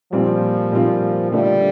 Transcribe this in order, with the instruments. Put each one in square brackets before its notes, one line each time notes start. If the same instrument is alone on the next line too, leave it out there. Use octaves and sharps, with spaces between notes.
[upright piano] A#2 G3 C4 F4 [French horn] F3
[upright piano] A#2 G3 C4 F4
[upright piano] D3 A3 D4 F4 [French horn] G3